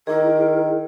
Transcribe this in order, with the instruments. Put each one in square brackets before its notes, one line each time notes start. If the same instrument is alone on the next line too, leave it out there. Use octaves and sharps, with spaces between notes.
[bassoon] D#3 [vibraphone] E4 G#4 [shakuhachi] A#4